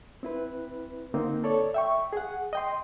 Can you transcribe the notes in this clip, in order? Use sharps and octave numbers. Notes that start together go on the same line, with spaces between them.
C4 E4 B4
D3 A#3 C4 D#4
A4 C#5 D5
E5 G5 C#6
G#4 F#5
D#5 G5 C6